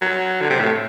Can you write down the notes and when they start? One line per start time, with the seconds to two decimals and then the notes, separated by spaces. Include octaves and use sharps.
0.01 F#3
0.41 D3
0.50 C3
0.60 A2